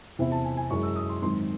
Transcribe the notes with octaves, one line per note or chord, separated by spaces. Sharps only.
E2 C3 E3 C4 E4 E5
A5
G#5
G#5
F#2 E3 G#3 C#6
E6
D#6
C6
G#2 D#3 F#3 C4 D#4 C6